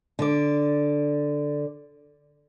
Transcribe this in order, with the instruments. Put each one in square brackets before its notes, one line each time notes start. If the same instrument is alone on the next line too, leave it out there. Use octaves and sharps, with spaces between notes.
[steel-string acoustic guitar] D3 D5